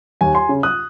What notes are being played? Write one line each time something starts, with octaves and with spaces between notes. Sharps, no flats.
D#2 G#5
G#5 C6
C#3
D#6 F#6